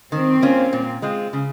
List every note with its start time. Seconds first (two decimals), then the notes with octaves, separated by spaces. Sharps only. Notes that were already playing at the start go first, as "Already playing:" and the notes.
0.12 D#3 C4
0.42 A#3 C#4 F4
0.73 A#2
1.02 G#3 C4 F4
1.33 C#3